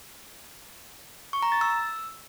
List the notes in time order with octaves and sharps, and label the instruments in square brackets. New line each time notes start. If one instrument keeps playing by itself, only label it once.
[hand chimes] C#6
A#5
A6
E6